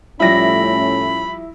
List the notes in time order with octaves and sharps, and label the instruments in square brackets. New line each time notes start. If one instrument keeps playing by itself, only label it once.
[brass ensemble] A2 A3 C#4 [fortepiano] F3 G3 [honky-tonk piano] E4 A#6 [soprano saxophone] B5